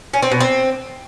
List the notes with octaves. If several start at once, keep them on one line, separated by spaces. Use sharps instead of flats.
C#4
C4
B2
C4